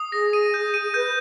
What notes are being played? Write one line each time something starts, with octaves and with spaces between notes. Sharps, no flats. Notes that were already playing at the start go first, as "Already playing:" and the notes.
Already playing: D#6
G#4 A#6
D#7
G6
D#7
B4 G6